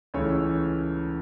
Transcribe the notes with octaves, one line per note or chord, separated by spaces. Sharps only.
C#2 C#3 E3 A3 C#5